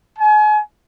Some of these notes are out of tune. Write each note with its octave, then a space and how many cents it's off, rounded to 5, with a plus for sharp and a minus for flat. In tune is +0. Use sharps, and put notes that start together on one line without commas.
G#5 +35